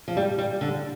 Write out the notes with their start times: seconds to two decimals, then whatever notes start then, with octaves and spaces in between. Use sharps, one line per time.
0.08 F3
0.17 G3
0.38 G3
0.61 D3